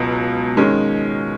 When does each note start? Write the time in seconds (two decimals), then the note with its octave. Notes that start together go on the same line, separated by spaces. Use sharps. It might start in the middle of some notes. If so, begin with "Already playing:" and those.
Already playing: C#2 B2 F#3
0.57 D#3 G#3 C#4